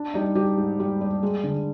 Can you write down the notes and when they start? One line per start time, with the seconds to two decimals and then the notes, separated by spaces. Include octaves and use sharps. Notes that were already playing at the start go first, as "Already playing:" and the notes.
Already playing: D4
0.14 G3 D#4
0.35 G3 G4
0.58 G#2
0.80 G3
1.01 G3
1.23 G#3
1.44 D3